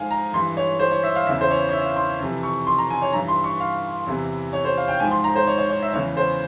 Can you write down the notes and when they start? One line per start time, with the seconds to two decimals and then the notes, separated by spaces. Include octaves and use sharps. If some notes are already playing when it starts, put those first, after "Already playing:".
Already playing: G#2 F3 F5 G#5
0.11 A#5
0.33 G2 E3 C6
0.57 C#5
0.79 C5
0.92 C#5
1.03 E5
1.15 F5
1.27 E2 C#3 E3 E5
1.41 C5
1.51 C#5
1.69 C#5
1.73 E5
1.85 F5
1.96 C6
2.20 F2 C3 E3
2.43 C#6
2.67 C6
2.78 A#5
2.90 G#5
3.02 C#5
3.13 G2 E3 A#5
3.28 C6
3.44 C#6
3.60 F5
4.07 E2 C3 E3
4.53 C#5
4.65 C5
4.77 F5
4.88 G5
5.00 G#2 F3 G#5
5.11 C6
5.24 A#5
5.36 C5
5.47 C#5
5.58 C#5
5.70 C#5
5.82 E5
5.93 E2 C#3 E3 C#5
6.17 C5